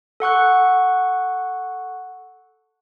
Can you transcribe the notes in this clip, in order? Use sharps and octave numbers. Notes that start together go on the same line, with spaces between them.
A4 F#5 C#6 F#6